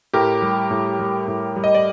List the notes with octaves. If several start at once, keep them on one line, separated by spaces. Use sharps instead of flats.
A2 G4 A#4
G3
A2
G3
A2
G3
D#5
D5